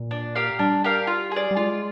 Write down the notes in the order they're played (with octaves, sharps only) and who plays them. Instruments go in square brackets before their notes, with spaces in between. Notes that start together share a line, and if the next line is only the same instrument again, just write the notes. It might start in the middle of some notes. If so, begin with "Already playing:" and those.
Already playing: [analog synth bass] A#2
[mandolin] D4
G4 A#4 F5
[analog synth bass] G3 [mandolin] D4
[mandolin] G4 A#4 F5
F4
G#4 D5
[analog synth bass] G3
[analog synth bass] G#3 [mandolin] F4